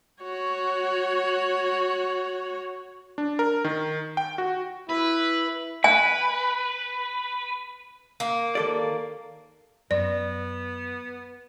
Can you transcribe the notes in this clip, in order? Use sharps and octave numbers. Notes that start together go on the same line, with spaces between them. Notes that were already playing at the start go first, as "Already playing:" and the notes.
F#4 C#5
D4
A#4
D#3
G5
F#4
E4 B4
B4 G#5
A#3
D#2 A4 D5
F#2 B3 D5